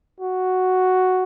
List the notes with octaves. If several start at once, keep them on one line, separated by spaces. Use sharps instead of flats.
F#4